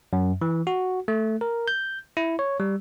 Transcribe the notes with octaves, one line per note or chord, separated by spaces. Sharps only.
F#2
E3
F#4
A3
A#4
G6
E4
C#5
G3